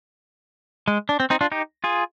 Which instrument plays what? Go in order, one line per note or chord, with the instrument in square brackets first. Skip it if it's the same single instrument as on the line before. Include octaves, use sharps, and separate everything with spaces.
[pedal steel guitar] G#3
D4
C4
C4 D#4
D4 F4
D#4 G4
F4 G#4